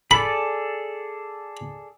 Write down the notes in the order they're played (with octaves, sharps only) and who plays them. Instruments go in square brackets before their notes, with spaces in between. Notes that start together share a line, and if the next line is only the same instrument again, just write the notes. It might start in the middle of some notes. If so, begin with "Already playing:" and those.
[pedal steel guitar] G#4 A4 D5 [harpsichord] B5